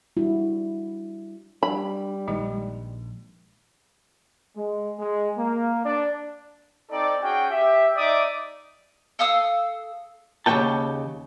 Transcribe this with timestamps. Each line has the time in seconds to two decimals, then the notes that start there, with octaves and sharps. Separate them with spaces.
0.17 G3 D4 E4 F#4
1.63 G3 D4 B5
2.27 A#1 D#3 G#3 D#4
4.55 G#3
4.98 G#3
5.37 A#3
5.84 D4
6.90 C4 D#4 A4 D5
7.22 C#4 F#4 G#4 G5
7.51 G4 E5
7.97 D#4 D5 E5 D6 D#6
9.19 A4 F5 D#6 E6
10.46 D#2 C#3 F#3 F#5 G5 A5